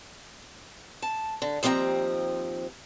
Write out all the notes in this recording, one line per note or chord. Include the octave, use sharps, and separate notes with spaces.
A5
D3
D#2 F3 C4 F5 A#5